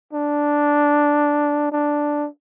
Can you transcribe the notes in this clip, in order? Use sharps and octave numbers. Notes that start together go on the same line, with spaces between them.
D4
D4